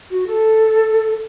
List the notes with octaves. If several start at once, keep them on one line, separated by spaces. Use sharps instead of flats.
F#4
A4